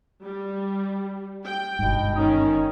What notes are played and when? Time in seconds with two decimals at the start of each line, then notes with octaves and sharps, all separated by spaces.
0.22 G3
1.45 G5
1.79 G1 G#2 B2
2.15 D#3 C#4 D#4